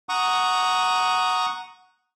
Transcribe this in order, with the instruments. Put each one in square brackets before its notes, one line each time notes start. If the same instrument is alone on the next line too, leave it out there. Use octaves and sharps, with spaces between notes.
[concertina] F#5 A#5 C#6 D#6